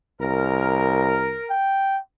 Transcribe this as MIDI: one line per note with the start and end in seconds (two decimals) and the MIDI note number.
0.20 1.38 36
0.20 1.51 70
1.50 2.00 79